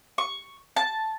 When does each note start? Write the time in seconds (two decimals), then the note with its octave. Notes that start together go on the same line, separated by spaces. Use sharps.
0.18 C#6
0.76 A5